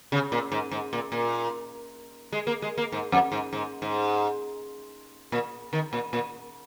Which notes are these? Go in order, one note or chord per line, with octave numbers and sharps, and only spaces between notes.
C#3
A#2
G#2
G#2
A#2
A#2
G#3
A#3
G#3
A#3
G#2
F2
G#2
G#2
G#2
A#2
D#3
A#2
A#2